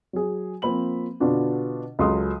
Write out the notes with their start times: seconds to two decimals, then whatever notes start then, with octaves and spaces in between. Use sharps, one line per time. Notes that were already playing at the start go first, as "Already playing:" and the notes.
0.13 F#3 G#4
0.62 F3 A#3 C4 B5 F#7
1.20 B2 D3 B3 D4 F4
1.99 C#2 F#3 A4 C6 D#6